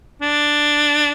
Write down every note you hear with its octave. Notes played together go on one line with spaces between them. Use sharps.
D4